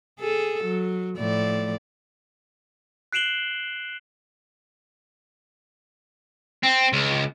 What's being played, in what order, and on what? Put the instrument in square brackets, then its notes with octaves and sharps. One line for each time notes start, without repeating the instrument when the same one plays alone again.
[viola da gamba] G#4 A4
F#3
A2 F3 D5
[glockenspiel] F#6 C7 D7 E7 F#7 G7
[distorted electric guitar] C4
C#2